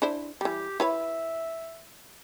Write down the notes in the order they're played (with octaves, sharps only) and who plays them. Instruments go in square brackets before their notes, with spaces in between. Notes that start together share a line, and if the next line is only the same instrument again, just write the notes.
[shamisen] D4 E4 C5
[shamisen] E3 G3 [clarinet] G4
[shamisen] E4 B4 C#5 [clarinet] E5